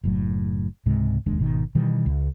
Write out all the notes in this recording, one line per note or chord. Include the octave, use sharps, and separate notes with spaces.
F#1 A2 F#3
C#2 G#2 C3 G#3
F1 D#2 G#3 D4
G#1 B2 D#3
B2 D#3 E3 G3
C#2